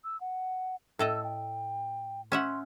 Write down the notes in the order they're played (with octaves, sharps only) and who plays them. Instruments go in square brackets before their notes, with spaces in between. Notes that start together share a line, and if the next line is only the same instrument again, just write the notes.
[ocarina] E6
F#5
[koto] A2 A4 D#5 [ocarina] E6
[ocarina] G5
[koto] C#4 E5 F#5 [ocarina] C6